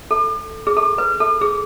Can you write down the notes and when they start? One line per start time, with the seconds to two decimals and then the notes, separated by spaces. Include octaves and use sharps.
0.11 A4
0.67 G#4
0.76 A4
0.98 B4
1.20 A4
1.42 G#4